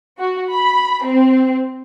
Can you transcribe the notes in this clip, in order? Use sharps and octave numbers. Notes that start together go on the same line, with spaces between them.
F#4
B5
C4